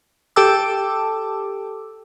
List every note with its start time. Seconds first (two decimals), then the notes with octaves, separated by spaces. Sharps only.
0.36 G4 A4 G5 A5 D6 E6